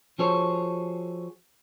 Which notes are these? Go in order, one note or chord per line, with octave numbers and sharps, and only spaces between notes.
F3 F#4 G#4 A4 C5 C#5